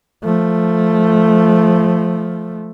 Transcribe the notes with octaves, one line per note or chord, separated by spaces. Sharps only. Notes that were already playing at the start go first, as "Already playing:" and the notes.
F3 A3